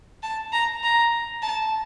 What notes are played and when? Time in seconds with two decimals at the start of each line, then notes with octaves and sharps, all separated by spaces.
0.23 A5
0.52 A#5
0.83 A#5
1.42 A5